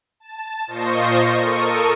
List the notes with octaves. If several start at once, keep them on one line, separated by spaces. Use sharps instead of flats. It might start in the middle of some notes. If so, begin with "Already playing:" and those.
A5
A#2 F4 C5 D#5 C#6 A#6
A4 A#4 C#6 D#6